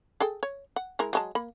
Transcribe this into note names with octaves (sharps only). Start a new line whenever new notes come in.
G#4 A4 G5
C#5
F#5
G#3 E4 A#4
F#3 G#3 A5
A#3 B5